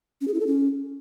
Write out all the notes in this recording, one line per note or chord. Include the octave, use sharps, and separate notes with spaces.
C#4
G#4
E4
A4
C#4